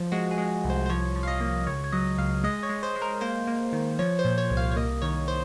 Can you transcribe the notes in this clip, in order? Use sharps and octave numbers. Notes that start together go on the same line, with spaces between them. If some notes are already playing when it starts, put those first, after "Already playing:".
Already playing: F3
G#3 F#4
G#4
G#3
C2
C5
C5
F3 C#5
F3
F5
D#5
A#3
C#2 C#5
C#5
F#3 D#5
C#2 F5
G#3 D#5
C#5
G#3
C5
G#3
A#4
A#3 C5
A#3
D#3
F3 C#5
C5
A#2
C#5
C2
F5
C#5
A#3 D#5
D#3 C#5
C5